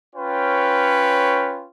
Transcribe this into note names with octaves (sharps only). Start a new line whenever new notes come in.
C#4 F4 B4 C#5 G5